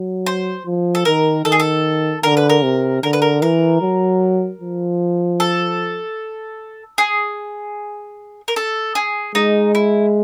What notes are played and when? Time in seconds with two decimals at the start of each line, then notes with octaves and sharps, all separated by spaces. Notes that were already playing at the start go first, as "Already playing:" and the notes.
Already playing: F#3
0.26 C5
0.66 F3
0.95 A4
1.05 D#3 A#4
1.45 D#3 A4
1.52 G#4
1.60 A4
2.23 D3 A#4
2.37 B4
2.49 A#4
2.63 C3
3.03 D3 A#4
3.13 B4
3.22 A#4
3.42 E3 A#4
3.81 F#3
4.62 F3
5.40 A4
6.98 G#4
8.48 A#4
8.56 A4
8.95 G#4
9.35 G#3 D#4
9.75 E4